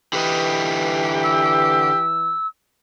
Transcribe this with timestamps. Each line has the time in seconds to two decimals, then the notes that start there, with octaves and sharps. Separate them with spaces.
0.13 D3 E3 G4 B4 D#5
1.24 E6